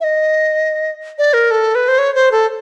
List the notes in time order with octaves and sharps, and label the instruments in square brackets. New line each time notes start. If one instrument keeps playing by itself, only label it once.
[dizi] E5
D#5
D5
A#4
A4
B4
C5
C#5
C5
A4